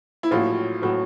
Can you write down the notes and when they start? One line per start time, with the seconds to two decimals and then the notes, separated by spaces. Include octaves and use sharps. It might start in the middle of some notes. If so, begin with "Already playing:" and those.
0.23 E4
0.31 A#1 A2 F#3 F4
0.82 A2 F#3